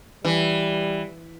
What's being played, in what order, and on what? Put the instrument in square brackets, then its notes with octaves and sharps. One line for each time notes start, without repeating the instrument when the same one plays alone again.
[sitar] E3 [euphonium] G3